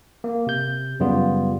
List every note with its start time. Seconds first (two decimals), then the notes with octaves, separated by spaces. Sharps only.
0.24 A#3
0.47 C3 G6
1.00 F#2 C#3 G3 B3 F4